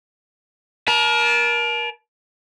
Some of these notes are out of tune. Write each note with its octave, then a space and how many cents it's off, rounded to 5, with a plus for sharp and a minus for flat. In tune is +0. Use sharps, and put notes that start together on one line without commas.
A#4 +25 A5 -30